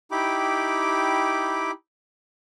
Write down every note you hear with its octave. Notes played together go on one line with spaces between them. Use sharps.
D#4 E4 G4 G5 B5 D6